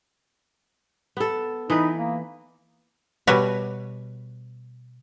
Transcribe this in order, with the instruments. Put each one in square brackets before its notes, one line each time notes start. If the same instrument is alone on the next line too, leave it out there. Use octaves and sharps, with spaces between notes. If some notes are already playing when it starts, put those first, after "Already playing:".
[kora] B3 A4
[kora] E3 B4 [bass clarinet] D#4
[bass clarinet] A#3
[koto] B2 G3 F#4 B4 C#5